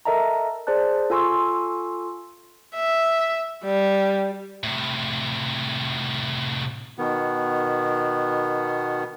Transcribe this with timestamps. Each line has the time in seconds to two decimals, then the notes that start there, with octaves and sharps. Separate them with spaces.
0.05 A4 A#4 D#5 E5 A5 A#5
0.67 G#4 C5 D5 A5 F#6
1.10 F4 A4 G#5 C6 C#6 E6
2.75 E5
3.64 G3
4.63 A2 C3
6.98 B2 D#3 B3